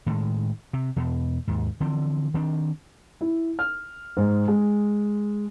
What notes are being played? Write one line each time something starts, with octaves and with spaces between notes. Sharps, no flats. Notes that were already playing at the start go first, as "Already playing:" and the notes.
A2 D#3 E3 G#3
C3
E2 B2
D#2 G#2
D3 E3 F3 C4
D#3 C4 D4
E4
F6
G#2
G#3